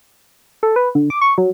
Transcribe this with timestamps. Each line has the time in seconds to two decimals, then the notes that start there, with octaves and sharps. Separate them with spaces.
0.63 A4
0.76 B4
0.95 D3
1.10 D6
1.21 C#6
1.38 F#3